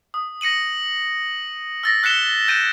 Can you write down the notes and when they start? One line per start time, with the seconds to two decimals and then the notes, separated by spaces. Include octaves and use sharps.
0.14 D#6
0.41 A#6 C#7 D#7 F#7
1.83 E6 A6 A#6
2.03 E6 F#6 B6 C#7 E7 G7
2.48 G6 A6 D7 D#7